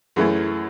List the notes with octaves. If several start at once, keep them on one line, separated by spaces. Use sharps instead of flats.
F#2 E3 A3 C#4 G#4